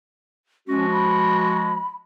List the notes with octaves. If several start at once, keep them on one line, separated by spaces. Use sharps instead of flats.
F3 G#3 C#4 F#4
B5